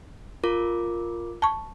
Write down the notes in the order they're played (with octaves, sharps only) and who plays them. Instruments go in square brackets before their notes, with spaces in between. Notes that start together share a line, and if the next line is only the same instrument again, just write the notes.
[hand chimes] F4 A#4 D6
[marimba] A5 C#6